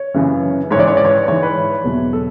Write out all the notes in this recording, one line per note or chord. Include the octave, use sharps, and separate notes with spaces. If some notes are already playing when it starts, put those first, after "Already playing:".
Already playing: C#5
F#2 C#3 E3
G#2 C#5
E3 D5
C#5
D5
C#5
G#2 E3 C#5
B4
E2 B2 F#3
A4